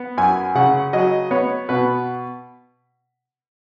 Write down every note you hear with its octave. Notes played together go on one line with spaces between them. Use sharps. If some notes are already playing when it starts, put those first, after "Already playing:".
Already playing: B3
F#2 G#5
C#3 F#5
F#3 D#5
B3 C#5
B2 B4